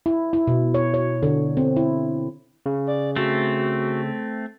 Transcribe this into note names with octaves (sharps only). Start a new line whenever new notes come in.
E4
E4
B2
C#5
C#5
D3
C4
E4
C#3
D5
A3 C4 F#4